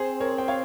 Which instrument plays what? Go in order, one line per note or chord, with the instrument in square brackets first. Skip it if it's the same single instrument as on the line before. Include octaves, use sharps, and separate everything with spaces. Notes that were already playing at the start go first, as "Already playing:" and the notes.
Already playing: [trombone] C4 [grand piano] G#4 C5
[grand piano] A#4 C#5
G5
C#5 F5